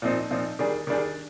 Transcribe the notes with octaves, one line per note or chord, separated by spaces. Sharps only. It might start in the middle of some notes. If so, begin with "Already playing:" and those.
A#2 F3 C4 D#4
A#2 F3 C4 D#4
D#3 G3 D4 G#4
D#3 G3 D4 G#4